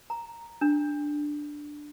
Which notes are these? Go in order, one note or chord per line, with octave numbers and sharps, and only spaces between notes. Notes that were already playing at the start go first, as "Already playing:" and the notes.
A#5
D4